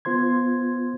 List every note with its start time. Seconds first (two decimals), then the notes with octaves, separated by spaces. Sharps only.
0.05 B3 F4 C5 C6 G#6